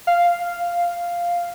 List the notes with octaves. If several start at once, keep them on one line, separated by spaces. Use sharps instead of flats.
F5